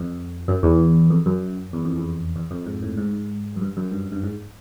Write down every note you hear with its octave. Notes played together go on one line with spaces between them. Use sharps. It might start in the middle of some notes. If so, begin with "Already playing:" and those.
Already playing: F2
F#2
E2
F2
F#2
E2
F2
E2
E2
F2
G#2
A2
G#2
F#2
G2
F#2
G2
G2
G#2